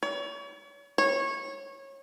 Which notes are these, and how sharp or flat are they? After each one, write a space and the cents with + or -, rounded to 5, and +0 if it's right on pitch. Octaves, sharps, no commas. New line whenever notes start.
C#5 +40
C#5 -20